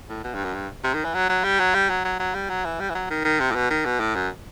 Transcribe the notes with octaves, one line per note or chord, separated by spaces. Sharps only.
A2
B2
G2
F#2
G2
C3
D#3
E3
F#3
F#3
G3
F#3
G3
F#3
F#3
F#3
G3
F#3
E3
G3
E3
F#3
D#3
D#3
C3
A2
B2
D#3
B2
A2
F#2